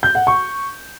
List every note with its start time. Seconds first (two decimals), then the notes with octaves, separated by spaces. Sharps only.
0.03 G6
0.15 F#5
0.27 C#6